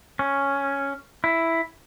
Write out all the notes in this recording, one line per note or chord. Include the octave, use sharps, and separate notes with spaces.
C#4
E4